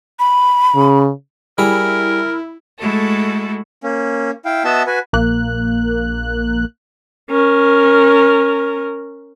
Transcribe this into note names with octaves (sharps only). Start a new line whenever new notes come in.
B5
C#3
G3 E4 G#4 A#4
G#3 A3 E4 F#4 A4
A#3 C#4
E4 F5 G5
B3 F#4 D#5 E5 A5 E6
F#4 B4 G#5
A#1 A#3 F#6
C#4 A#4